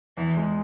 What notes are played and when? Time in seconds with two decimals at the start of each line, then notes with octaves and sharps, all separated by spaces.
0.17 E2 E3
0.37 G#3